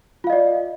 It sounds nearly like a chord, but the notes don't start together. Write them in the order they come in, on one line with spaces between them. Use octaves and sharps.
F4 F5 D#5 D5